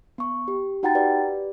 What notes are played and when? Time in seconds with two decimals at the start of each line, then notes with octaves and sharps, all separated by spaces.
0.18 B3 C#6
0.48 G4
0.83 D#4 F#4 F#5 G5 A#5 A6
0.95 G4 B4 D5